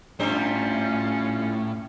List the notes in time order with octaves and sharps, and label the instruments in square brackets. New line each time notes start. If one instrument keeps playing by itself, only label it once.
[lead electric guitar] A2 [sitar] G3 D4 C5 [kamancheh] C#4 F4